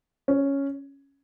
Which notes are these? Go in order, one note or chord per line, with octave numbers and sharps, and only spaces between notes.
C#4